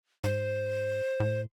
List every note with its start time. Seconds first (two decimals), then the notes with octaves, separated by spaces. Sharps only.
0.24 G#2 C5
1.20 A2